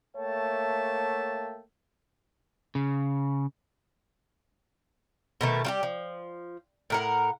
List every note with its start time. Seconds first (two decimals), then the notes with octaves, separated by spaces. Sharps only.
0.16 A3 A#3 C#5 E5 G5 A5
2.75 C#3
5.41 B2 D#3 A3
5.64 G3 F4 G4
5.83 F3
6.90 A2 A#4 F#5